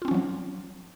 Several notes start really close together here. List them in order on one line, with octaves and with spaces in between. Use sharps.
F4 C4 C#4 F3 F#3